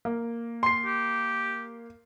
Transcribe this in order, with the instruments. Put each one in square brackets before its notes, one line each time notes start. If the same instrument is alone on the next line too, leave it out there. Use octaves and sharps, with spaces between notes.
[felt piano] A#3
[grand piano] C6 C7
[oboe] G4